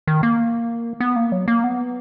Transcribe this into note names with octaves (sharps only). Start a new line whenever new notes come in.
D#3
A#3
B3
A#3
F#3
A#3
B3